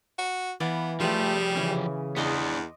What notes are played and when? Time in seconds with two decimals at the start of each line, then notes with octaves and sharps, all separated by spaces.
0.18 F#4
0.60 E3 B3 D5 F5
1.00 F3 G3 A3 F4 G4 G#4 B4
1.55 C#3 E3 C#4
2.16 E2 B3 D4 D#5 C6 D6